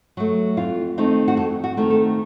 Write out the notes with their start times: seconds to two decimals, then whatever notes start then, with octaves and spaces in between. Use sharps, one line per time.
0.17 F#3 A3
0.57 F2 F4
0.98 D#3 A3 C4 D#4
1.28 F#4
1.37 F2 A4
1.64 F#4
1.77 D#3 A3 C4 D#4
1.90 A4